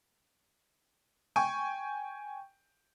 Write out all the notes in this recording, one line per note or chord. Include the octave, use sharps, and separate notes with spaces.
G5 G#5 C#6